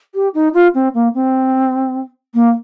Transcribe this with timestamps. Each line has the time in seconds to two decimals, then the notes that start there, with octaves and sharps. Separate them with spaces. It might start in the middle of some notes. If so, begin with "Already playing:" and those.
0.14 G4
0.34 D#4
0.54 F4
0.74 C4
0.94 A#3
1.14 C4
2.34 A#3